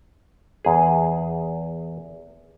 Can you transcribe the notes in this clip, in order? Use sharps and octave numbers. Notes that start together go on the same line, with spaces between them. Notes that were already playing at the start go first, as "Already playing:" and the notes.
E2 G#4